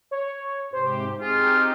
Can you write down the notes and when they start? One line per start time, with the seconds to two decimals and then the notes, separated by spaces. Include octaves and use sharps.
0.11 C#5
0.73 G#2 C3 G4 C5
1.21 C4 D#4 F4 G4 G#4